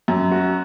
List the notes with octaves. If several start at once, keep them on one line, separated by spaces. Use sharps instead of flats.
F#2
F#4